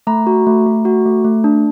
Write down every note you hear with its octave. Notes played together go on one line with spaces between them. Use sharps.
A3 A#5
F#4
A3
A3
F#4
A3
A3
D4